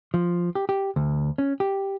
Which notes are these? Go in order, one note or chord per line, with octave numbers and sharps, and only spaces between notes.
F3
G4
G4
D2
C#4
G4